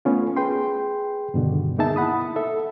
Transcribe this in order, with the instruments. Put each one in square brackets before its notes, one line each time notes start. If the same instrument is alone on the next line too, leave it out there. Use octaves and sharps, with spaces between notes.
[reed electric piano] A3 B3 C#4 F4
G#4 B4 G5 C6
G2 B2 D3 D#3
A#3 B3 D#4 G#4 E5 A5
E4 F#5 B5 D#6
A4 E5